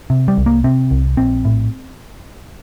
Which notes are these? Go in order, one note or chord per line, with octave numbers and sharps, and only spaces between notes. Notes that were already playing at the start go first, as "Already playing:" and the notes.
C3
G3
C2
A#3
C3 C4
C2
A#1 C4
A2